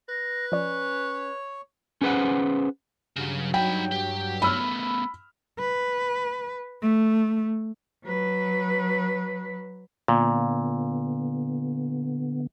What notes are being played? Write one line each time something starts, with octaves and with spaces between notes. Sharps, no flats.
B4 A#6
F3 C#4 C#5 D5
C#4 G#4 B4 C5 F#5
G2 C#3 F#3
D#4 G5 B5
G4
A3 B3 B5 E6 F6
B4
A3
F#3 B4
A#2 D3 B3